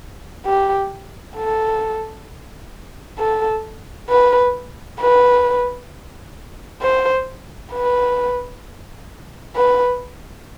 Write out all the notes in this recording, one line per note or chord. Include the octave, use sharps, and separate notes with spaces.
G4
A4
A4
B4
B4
C5
B4
B4